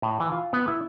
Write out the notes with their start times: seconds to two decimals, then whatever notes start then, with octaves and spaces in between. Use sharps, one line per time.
0.02 A2
0.20 E3
0.32 F4
0.53 B3
0.68 E4